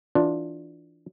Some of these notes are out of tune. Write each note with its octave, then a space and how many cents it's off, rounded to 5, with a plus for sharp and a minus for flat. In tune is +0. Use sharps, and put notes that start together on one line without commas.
E3 +0 D4 +0 F4 +15